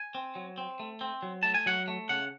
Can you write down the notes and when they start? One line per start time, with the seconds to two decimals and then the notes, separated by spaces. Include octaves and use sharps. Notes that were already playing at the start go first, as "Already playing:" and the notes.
Already playing: G#5
0.15 C4
0.35 F#3
0.58 C4
0.80 A3
1.01 C4
1.22 F#3
1.43 A3 A5
1.54 G#5
1.66 F#3 F#5
1.88 A3
2.09 C#3 F#5